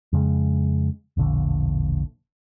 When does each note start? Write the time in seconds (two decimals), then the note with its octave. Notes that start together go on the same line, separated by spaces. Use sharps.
0.13 F2 C#3 G#3
1.17 E1 A#1 D3